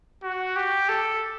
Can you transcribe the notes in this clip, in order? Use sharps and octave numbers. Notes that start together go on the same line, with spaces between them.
F#4
G4
A4